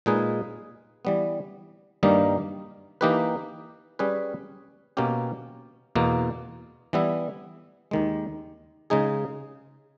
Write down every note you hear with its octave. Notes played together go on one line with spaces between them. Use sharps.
A#2 G#3 D#4 G#4 B4
E3 G3 B3
G2 D#3 G3 A#3 D#4
E3 A#3 D#4 G4 B4
G3 C#4 G#4 B4
B2 A#3 C#4 G4
E2 B2 A#3
E3 G3 B3 E4
D#2 D#3 G#3
C#3 G#3 D#4 G#4